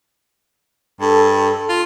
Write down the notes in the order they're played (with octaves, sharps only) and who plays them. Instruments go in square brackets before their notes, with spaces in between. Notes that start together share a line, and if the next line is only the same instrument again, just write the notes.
[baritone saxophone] G2 [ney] A4
[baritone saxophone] F4